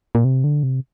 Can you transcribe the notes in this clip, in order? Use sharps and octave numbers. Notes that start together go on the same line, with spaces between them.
A#2
C3
D3
C3